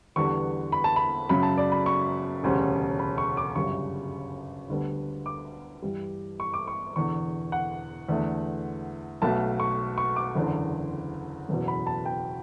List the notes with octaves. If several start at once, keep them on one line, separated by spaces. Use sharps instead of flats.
E2 D3 G3 B3 C#6
B5
A5
B5
F#2 C#3 F#3 B5
A5
D5
B5
C#6
E1 D2 C#3 G3 C#4
B5
C#6
D6
G1 F#2 C#3 G3 C#6
D2 D3 G3 B3
D6
G2 E3 G3
C#6
D6
C#6
E1 E2 D3 C#6
F#5
E2 D3 A3
B1 B2 A3 A5
C#6
C#6
D6
F#1 E2 D3
F#1 E2 B2
B5
A5
G5